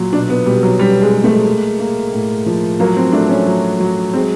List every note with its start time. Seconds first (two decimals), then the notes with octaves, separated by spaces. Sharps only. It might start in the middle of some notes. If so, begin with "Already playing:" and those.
Already playing: A#2 F#3
0.13 B2 D4
0.30 B3
0.46 B2 G3
0.63 F#3
0.79 G3 C#4
1.02 G#3
1.13 G#3
1.24 A3
1.46 A#3
1.79 A#3
2.13 A2
2.46 F3
2.80 F#3 A#3
2.97 C4
3.12 A3 D4
3.30 C#4
3.46 F#3
3.80 F#3
4.13 G#3 C4